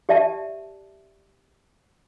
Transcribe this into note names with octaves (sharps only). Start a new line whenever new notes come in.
G4 D5 E5 A5